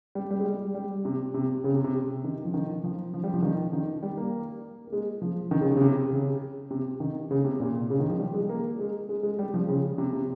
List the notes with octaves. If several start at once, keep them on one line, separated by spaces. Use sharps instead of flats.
G3
G3
G#3
G3
G3
C3
C3
C#3
C3
C3
D#3
F3
D#3
F3
F3
G3
F3
D#3
D#3
G3
A#3
A#3
G#3
F3
D#3
C#3
C3
C#3
C3
C#3
C3
D#3
C#3
C3
A#2
C#3
D#3
F3
G3
G#3
A#3
G#3
G#3
G#3
G3
F3
C#3
C3
C3